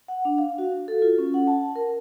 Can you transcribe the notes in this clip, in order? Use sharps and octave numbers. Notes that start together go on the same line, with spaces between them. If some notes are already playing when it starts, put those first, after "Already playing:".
F#5
D4
F5
F#4
A4
F4
C#4
F#5
A5
A#4